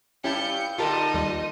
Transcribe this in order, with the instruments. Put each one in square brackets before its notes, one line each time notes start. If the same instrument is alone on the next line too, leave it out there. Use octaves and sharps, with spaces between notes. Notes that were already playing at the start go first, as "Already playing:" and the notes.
[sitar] G2 G4 [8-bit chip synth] C#4 E4 A5 [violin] G6 C#7
[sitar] A#2 D3 [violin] D#4 D#5 [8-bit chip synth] F4 G4 A#4 [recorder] A5
[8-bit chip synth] D#2 G3